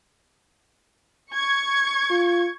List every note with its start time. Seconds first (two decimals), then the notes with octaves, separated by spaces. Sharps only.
1.33 C#6 G#6
2.10 F4